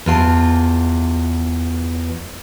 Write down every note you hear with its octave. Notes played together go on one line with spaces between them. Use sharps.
E2 F4 A5